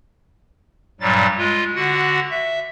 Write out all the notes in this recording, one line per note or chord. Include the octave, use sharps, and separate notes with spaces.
G2 A#2 F#3 G3 A6
G#3 F4
D3 F#4 F#5
E5